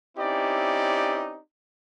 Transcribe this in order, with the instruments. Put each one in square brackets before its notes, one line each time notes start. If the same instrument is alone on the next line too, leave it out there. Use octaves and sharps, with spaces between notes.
[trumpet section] C4 C#4 D#4 E4 G4 D5